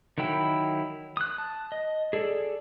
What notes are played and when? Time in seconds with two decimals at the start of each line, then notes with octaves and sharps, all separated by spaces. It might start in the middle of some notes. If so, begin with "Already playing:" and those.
0.18 D#3 F#3 E4 G5 B5
1.17 D#6 F#6
1.38 A5
1.72 D#5
2.13 G#4 A4 D5